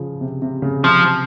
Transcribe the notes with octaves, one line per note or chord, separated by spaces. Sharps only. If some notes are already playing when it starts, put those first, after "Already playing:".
Already playing: C#3 F3
C3
C3
C#3
C3 F3